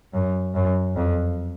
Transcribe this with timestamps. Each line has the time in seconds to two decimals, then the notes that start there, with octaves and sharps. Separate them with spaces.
0.14 F#2
0.55 F#2
0.96 F2